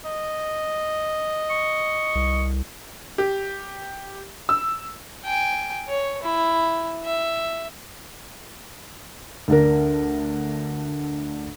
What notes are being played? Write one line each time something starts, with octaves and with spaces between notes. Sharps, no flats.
D#5
C#6
C2
G4
E6
G5 G#5
C#5
E4
E5
D2 D4 A#4